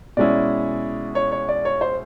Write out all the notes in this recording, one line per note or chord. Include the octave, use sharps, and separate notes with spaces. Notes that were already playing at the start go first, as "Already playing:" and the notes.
B2 G#3 C#4 E4 D5
C#5
C#5
D5
C#5
C5